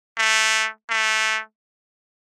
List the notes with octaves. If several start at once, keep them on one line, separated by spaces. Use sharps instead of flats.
A3
A3